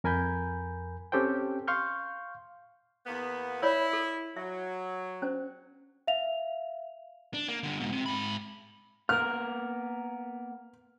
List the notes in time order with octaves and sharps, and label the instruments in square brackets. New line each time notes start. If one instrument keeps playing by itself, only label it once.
[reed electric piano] F2 A#4 G#5 B5 G6
C4 C#4 G4 A4 C5 G5
F5 C6 C#6 F6 G6
[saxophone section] E2 A#3 B3
[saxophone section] E4 [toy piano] C#5 D5 B5
[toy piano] A4
[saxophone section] F#3 [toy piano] E5
[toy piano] C#4 D4 C5
[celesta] E5 F5 F7
[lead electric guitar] D4
A#3
G2 D3
G#2 B2
C3
G#2 B5
[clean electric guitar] A#3 B3 A#4 [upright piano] F6